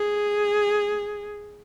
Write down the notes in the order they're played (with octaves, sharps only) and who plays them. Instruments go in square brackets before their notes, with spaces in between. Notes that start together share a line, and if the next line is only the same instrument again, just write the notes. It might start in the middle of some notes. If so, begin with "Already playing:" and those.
Already playing: [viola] G#4